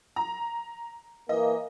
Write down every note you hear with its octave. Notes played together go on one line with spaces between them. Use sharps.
A#5
E3 A#3 D#5